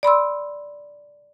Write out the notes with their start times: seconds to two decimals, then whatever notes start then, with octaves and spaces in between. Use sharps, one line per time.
0.03 D5 B5 C6 E6